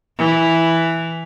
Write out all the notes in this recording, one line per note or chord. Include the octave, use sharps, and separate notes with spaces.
E3